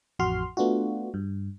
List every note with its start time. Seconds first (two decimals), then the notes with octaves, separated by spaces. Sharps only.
0.19 A1 F2 F#4 C6 F6
0.57 A3 B3 D4 F4 F#4
1.14 G2